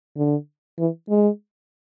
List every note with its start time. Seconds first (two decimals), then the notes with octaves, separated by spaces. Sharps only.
0.17 D3
0.79 E3
1.10 G#3